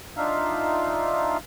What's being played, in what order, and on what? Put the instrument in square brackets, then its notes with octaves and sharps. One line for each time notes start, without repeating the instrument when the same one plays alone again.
[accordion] D4 D#4 F4 E5 F5